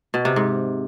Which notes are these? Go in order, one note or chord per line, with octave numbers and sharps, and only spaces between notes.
B2
C3
G#2